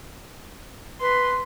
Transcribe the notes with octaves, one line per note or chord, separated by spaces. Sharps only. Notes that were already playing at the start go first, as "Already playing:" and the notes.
B4 C6